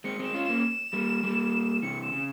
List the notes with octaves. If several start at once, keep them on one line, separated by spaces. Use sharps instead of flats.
G#3 C4 C#7
G#3 C4 E7
C#4 F4
E7
A#3 C#4
G3 A#3
G3 A#3
C3 E3 C#7
E7
C#3